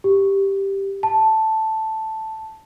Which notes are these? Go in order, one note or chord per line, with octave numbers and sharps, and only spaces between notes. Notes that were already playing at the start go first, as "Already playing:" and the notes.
G4
A5